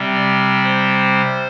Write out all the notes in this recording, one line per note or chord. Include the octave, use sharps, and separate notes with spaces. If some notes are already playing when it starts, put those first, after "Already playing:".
Already playing: C3 G3 C4
D5
C5